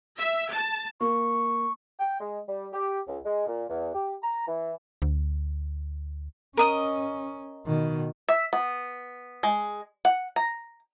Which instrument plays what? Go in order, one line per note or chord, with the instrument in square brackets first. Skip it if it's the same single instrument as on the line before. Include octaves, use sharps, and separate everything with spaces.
[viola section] E5
A5
[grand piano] A#3 [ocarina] C#6
[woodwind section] G5
G#3
G3
G4
C#2
G#3
A#2
E2
G4
A#5
E3
[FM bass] D2
[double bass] C#4 [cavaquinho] A#4 D#5 D#6
[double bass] B2 D#3
[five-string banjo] E5
B3
G#3
F#5
A#5